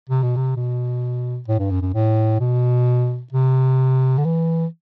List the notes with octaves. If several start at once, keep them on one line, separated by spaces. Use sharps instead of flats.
C3
B2
C3
B2
A2
G2
F#2
F#2
A2
B2
C3
D3
E3